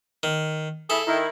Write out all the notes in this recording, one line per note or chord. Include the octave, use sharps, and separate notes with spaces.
D#3
E4 G#4 A4 E5
D#3 E4